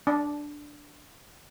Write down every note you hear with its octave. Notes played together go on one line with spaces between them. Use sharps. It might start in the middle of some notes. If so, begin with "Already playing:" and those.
D4